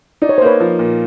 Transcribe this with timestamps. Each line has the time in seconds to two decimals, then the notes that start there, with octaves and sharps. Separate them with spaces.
0.22 D#4 D5
0.29 C#5
0.38 C5
0.41 A#3 B4 C#5
0.60 F3
0.79 A#2